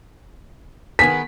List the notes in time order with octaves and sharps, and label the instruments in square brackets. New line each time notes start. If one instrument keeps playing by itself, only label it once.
[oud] D#3 B3 G#4 [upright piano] B6